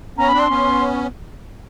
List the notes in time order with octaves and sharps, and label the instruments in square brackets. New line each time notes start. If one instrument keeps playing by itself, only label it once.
[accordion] B3 C#4 [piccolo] A#5
[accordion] C4 D4 [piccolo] B5
[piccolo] C6
[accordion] B3 C#4